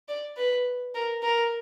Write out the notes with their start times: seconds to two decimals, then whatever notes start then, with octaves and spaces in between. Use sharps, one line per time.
0.08 D5
0.37 B4
0.95 A#4
1.23 A#4